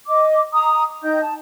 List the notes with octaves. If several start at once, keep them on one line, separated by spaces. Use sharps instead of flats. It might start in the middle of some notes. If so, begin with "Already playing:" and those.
D#5 D6
A#5 D#6
D#4 D#5 G5 G6
A5